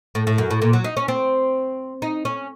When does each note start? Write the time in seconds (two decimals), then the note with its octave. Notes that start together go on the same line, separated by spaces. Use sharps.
0.15 A2
0.27 A2
0.38 F#2
0.51 A2
0.62 A#2
0.73 F#3
0.84 D#4
0.97 C#4
1.08 C4
2.02 D#4
2.25 C#4